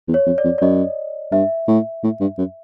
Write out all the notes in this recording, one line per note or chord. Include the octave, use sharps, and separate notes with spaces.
E2
C#5
F2
D5
F2
D5
F#2 D#5
G2 E5
A2
A2
G2
F#2